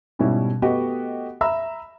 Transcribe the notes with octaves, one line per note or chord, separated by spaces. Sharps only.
G#2 B2 G3 C#4 E4
A3 B3 F#4 G4 D#5 F#5
E5 A#5 B5 E6